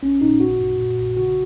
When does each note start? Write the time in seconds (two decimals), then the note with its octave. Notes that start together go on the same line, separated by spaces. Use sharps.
0.02 A#1 C#4
0.21 A#2 D#4
0.40 G#1 F#4
0.60 F#2
0.79 A#2
0.98 A#1
1.17 C#3 F#4